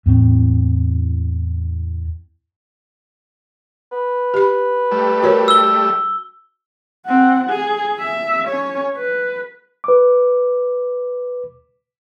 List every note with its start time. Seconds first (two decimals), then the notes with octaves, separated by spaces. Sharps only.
0.06 E2 A2 C4
3.92 B4
4.34 G4 B5
4.91 G3 A3
5.23 F#4 A#4 C#5
5.48 E6 G7
7.06 C4 F#5
7.50 G#4
7.99 E5
8.48 C#4 C#5
8.97 B4
9.84 B4 D6